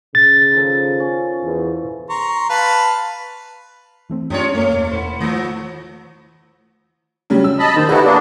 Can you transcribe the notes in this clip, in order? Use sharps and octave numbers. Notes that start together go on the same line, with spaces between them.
C#3 A6
D#3 F3 A4
C#4
E2
A#5 C6 C#6
B4 F5 A5
E3 A3 C4
F#2 G#3 C#4 D4 F4 G4 C#5
A3 A#3 C#5
E1
B3 E4 C5
D#3 F3 A3
C#3 F#3 G3
E6
D#5 A5 B5
D#3 C5
D#4 E4 F#4 G4 A4 B4
A#3 B3 D4